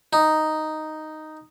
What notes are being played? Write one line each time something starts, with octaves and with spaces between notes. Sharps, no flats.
D#4